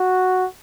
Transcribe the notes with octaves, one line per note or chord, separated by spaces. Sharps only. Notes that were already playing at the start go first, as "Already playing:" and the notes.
Already playing: F#4